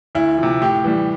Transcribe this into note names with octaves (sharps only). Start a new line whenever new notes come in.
D2 E4
C3 F3
A2 G4
E3 G3